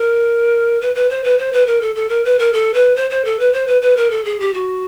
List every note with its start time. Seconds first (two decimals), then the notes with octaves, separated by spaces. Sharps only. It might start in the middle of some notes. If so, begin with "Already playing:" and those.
Already playing: A#4
0.81 B4
0.95 B4
1.10 C5
1.24 B4
1.39 C5
1.53 B4
1.67 A#4
1.81 A4
1.96 A4
2.09 A#4
2.25 B4
2.39 A#4
2.53 A4
2.74 B4
2.96 C5
3.10 C5
3.25 A4
3.39 B4
3.53 C5
3.67 B4
3.82 B4
3.97 A#4
4.11 A4
4.25 G#4
4.40 G4
4.54 F#4